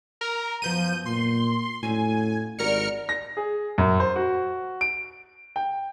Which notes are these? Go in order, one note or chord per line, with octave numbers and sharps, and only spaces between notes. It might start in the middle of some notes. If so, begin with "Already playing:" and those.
A#4
F#2 F3 B3 G6 D#7
A#2 C6
F2 A2 C#4 F#4 G#5
G#1 G3 F#4 A#4 F6 C#7
A#6
G#4
F#2
C5
F#4
D7
G5